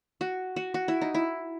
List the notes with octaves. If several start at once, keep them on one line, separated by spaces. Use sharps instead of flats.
F#4
F#4
F#4
E4
D#4
E4